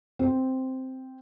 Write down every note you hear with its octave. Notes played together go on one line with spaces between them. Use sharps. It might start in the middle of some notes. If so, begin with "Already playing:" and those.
C4